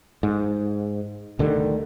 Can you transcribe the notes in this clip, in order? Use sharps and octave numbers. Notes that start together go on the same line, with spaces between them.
G#2
D2 D3 D#3 G3